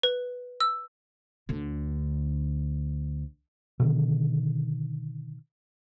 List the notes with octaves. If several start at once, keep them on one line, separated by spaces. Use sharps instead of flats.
B4
E6
D2 D3
B2 D3 D#3